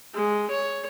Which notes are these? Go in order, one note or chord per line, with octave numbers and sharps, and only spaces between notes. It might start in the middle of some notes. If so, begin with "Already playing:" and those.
G#3
C#5